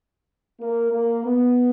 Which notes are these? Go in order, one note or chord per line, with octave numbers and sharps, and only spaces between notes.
A#3
A#3
B3